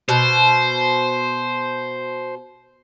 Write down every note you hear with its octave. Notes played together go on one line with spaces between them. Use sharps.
B2 C5